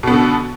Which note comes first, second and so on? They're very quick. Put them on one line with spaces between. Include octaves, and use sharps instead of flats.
B2 B3 D3